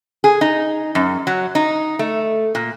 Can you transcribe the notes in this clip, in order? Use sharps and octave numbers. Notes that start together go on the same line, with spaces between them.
G#4
D#4
F#2
F#3
D#4
A3
A#2